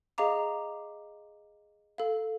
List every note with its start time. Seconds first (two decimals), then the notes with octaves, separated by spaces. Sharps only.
0.18 G#4 D#5 F5 A#5 D6
1.98 A4 F5